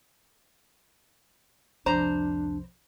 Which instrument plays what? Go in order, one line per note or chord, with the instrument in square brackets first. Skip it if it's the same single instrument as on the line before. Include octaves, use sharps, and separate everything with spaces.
[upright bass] C2 F2 [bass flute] D4 [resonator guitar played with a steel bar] C5 A#5